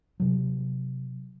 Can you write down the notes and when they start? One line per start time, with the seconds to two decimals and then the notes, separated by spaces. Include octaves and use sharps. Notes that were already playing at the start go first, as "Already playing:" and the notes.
0.20 C3 F#3